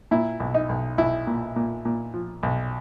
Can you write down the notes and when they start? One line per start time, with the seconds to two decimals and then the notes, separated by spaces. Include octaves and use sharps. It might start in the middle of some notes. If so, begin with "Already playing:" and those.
0.11 A#2 E4
0.40 B1
0.54 D#4
0.69 B1
0.98 B1 E4
1.27 A#2
1.56 A#2
1.85 A#2
2.14 F3
2.43 B1